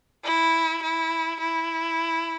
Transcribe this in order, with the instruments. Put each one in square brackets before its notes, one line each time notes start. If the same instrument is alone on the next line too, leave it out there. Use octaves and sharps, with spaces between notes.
[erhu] E4
E4
E4